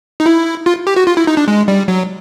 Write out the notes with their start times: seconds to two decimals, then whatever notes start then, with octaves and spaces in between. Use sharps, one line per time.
0.20 D#4
0.26 E4
0.66 F4
0.87 G4
0.96 F#4
1.07 F4
1.17 E4
1.27 D#4
1.37 D4
1.48 G#3
1.68 G3
1.88 F#3